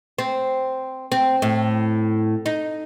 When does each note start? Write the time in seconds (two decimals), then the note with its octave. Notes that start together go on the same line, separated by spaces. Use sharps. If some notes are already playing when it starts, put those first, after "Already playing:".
0.19 C4
1.12 C4
1.42 A2
2.46 D#4